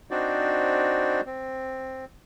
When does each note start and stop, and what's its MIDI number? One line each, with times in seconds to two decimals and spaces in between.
0.11 1.21 60
0.11 1.21 62
0.11 1.21 63
0.11 1.21 66
0.11 1.21 72
0.11 1.21 74
1.26 2.05 60